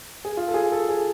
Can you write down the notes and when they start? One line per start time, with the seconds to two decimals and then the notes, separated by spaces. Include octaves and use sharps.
0.25 G#4
0.37 F4
0.48 A4
0.54 G#4
0.72 A4
0.89 G#4